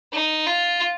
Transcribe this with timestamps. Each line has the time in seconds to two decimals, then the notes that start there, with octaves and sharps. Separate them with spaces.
0.13 D#4
0.46 F4